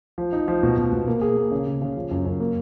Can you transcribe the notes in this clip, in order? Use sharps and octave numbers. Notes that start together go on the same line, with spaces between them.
F3
D#4
F3
B2
B2
B2
A#3
G#4
A#3
C#3
C#3
C#3
F3
F#2
F#2
A#3